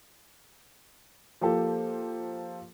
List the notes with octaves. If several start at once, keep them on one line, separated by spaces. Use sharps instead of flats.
F3 A#3 G4 A4